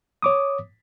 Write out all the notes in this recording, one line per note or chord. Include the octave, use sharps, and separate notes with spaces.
C#5 D6 D#6